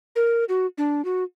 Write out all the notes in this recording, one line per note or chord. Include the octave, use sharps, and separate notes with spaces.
A#4
F#4
D4
F#4